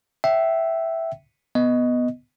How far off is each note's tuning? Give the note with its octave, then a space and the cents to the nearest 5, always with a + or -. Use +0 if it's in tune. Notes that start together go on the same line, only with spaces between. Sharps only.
E5 +0 G5 -30
B3 +0 D#5 +0